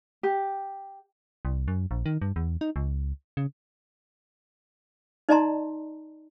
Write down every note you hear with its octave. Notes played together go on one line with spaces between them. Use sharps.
G4
C2
F#2
A#1
D#3
G2
E2
D#4
C#2
C#3
D#4 D5 D#5 A5 A#5 C6